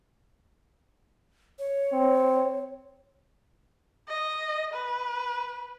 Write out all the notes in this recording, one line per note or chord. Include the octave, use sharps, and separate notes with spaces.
C#5
C4
D#5
B4